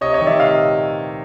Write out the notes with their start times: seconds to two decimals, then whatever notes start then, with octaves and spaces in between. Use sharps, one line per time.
0.01 C3 C#5 D#5
0.14 C#5 D#5
0.20 D#3 G3
0.26 D5 E5
0.39 C3 D#5 F5